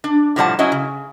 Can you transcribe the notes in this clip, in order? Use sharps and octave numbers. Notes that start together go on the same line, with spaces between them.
D4
A2 C3 F3 G3 F#5 A5
F#3 C#4 E4 D#5
C#3